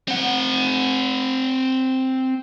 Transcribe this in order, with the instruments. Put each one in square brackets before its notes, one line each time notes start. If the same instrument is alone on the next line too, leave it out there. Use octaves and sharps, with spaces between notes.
[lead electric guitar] C4 F#5